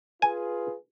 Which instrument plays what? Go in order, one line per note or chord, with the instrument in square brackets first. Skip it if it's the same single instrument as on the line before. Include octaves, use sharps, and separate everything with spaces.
[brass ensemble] F4 G#4 B4 [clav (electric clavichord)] G#5